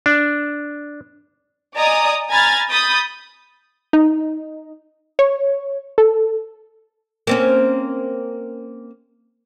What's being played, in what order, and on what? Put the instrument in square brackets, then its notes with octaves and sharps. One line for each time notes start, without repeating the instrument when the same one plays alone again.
[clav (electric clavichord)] D4
[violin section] D5 D#5 G#5 A#5 D#6
G#5 A#5 B5 F6 G#6 A6
B5 D#6 G6 A6
[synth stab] D#4
C#5
A4
[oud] A#3 C4 C#4